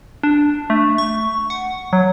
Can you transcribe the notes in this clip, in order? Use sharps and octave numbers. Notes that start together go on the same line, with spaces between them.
D4
A3
C#6
F#5
F#3